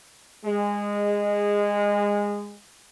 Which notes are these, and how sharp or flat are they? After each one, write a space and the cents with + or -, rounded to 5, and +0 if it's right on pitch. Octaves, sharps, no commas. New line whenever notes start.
G#3 -20